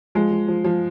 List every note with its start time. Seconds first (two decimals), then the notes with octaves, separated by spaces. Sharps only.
0.15 F3 G#3
0.31 F3
0.48 F3
0.64 F3